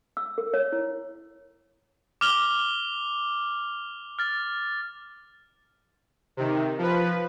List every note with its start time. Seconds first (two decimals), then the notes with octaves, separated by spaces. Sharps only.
0.17 E6
0.38 A#4
0.54 C#5
0.72 E4
2.21 D6 F6 F7 G7
4.19 F6 A6
6.37 C3 D#3
6.78 F3 B4